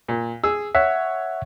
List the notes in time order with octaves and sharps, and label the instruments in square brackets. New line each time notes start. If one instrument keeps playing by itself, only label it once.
[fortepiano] A#2
G#4 E6
[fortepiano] C#5 [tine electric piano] E5 F#5